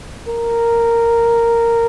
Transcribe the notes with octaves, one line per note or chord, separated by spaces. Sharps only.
A#4